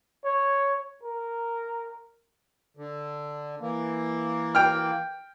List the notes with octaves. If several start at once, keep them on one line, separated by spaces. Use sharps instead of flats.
C#5
A#4
D3
E3 A#3
G5 F6